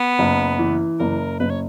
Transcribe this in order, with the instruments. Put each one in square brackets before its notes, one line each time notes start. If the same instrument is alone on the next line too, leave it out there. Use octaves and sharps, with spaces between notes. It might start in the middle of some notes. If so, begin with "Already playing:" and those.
Already playing: [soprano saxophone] B3
[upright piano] F#1
E3
[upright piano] F#1 [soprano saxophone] A#4
[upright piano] F#1 [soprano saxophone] B4
[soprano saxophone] C#5